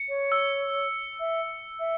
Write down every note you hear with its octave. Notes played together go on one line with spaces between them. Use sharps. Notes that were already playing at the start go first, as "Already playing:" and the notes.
Already playing: C#7
C#5
E6
E5
E5